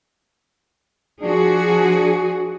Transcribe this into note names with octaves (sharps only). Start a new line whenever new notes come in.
F3 D4 F#4 G#4